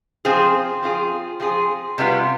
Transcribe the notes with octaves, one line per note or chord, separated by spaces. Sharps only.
F3 C4 F4 G#4
F3 C4 F4 G#4
F3 C4 F4 G#4
C3 G3 B3 F4